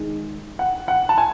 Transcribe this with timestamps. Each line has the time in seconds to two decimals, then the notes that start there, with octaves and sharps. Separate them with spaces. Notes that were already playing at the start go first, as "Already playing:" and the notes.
Already playing: D#3 G#3 D#4
0.59 F#5
0.88 F#5
1.09 A5
1.18 G#5